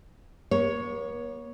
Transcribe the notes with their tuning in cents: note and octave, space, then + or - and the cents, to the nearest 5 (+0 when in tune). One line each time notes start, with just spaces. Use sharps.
A#3 +45 C#5 +5